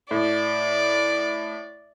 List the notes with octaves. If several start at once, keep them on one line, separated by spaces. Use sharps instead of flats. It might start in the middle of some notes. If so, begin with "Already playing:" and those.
A2 D5